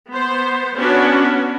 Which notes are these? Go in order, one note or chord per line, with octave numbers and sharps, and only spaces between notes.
B3 C5
B3 C#4 D4 F#4